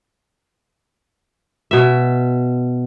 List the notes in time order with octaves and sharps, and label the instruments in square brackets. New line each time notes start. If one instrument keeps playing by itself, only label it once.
[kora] B2 E5